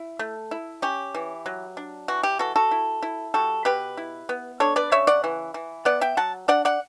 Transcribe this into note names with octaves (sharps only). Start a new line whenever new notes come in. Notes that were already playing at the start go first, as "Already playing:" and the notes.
Already playing: E4
A3
E4
C#4 G4
E3
F#3
D4
E3 F#4
G4
E3 F#4 A4
F#4 A4
E4
E4
G3 F#4 A4
B2 G4 B4
E4
B3
D4 A4 C#5
B4 D5
C#3 C#5 E5
D5 F#5
E3
E3
B3 D5 F#5
E5 G5
F#3 F#5 A5
D4 D5 F#5
D5 F#5